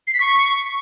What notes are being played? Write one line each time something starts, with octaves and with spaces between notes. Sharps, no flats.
C7
B6
C#6